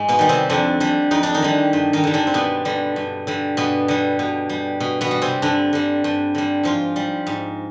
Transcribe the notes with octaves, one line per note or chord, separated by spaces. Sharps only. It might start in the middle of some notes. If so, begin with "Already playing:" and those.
Already playing: G#2 G#3
B2 B3
D#3 G3
C3 C4
F2 D3 D4
D3 G3
F2 D#4
D4
D#3 D#4
D3 G3
G2
D#3 D#4
D3 G3
D3 D4
C4
G2 B2 B3
D3 G3
G2
D3 G3
G2 B2 B3
D3 G3
B2
G3
B2
B2 B3
G3
C3 C4
G2 D3 D4
D3 G3
G2
D3 G3
G#2 F3 F4
G3
G#2